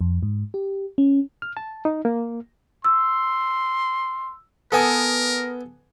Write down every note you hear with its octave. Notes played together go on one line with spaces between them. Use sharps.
F2
G#2
G4
C#4
F6
A5
D#4
A#3
C6 E6
B3 A4 A#4 G5 G#5 D#6